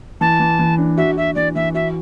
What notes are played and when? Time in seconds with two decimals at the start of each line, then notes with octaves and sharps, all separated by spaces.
0.21 E3 A5
0.40 E3
0.59 E3
0.78 D4
0.97 F#4 E5
1.17 F#4 E5
1.35 E3 D5
1.55 E3 E5
1.74 F#4 E5